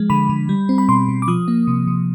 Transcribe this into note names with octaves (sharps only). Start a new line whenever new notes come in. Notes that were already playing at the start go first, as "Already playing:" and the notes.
Already playing: F3 G#3
D3 B5
D3
G3
C4
B5
B2 C6
B2
D6
F3 D#6
A#3
C3
C3